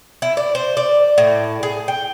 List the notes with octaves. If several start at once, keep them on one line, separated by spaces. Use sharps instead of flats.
E4
D5
C5
D5
A2
G#4
G5